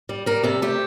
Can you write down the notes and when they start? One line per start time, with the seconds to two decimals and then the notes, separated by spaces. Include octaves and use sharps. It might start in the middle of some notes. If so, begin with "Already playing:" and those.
0.09 G3
0.26 G3 A#4
0.43 C3 A4
0.62 A3 G4